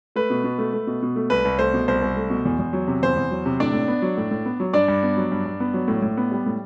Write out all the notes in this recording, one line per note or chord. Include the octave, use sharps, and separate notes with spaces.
A3 B4
B2
B2
A3
A3
B2
B2
A3
C2 B4
C2
A3 C5
B2
C2 C5
C2
A3
B2
E2
E2
F#3
C3
E2 C5
E2
F#3
C3
A2 D4 D5
A2
B3
F#3
A2
A2
B3
F#3
G2 D4 D5
G2
B3
F#3
G2
G2
B3
F#3
A2
A2
B3
G3
A2